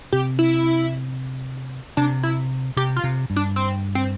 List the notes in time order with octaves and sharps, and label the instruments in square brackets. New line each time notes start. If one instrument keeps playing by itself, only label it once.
[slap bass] C3 [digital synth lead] G4
[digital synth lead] E4
[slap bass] C3 [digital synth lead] D4
[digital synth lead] E4
[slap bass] C3 [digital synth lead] G4
[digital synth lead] F4
[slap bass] C3
G2
[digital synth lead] D4
C4
C4